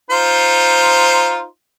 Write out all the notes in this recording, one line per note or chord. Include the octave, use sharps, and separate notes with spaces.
D#4 F4 C5